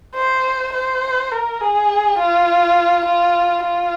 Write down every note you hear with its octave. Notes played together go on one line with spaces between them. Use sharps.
C5
C5
A#4
G#4
F4
F4
F4